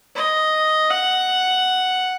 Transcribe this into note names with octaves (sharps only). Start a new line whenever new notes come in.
D#5
F#5